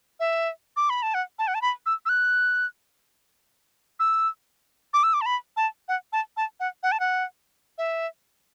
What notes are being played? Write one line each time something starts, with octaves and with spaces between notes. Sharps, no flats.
E5
D6
B5
A5
F#5
A5
F#5
A5
B5
E6
E6
F#6
E6
D6
E6
D6
A5
B5
A5
F#5
A5
A5
F#5
F#5
A5
F#5
E5